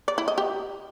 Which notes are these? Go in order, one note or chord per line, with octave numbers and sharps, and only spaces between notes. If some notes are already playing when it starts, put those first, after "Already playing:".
D5
E4
D#5
G4